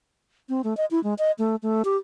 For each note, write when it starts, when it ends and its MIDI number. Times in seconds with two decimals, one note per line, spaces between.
0.49 0.62 60
0.64 0.76 57
0.77 0.86 75
0.91 1.02 64
1.04 1.14 56
1.19 1.31 75
1.39 1.56 57
1.63 1.82 57
1.85 1.97 67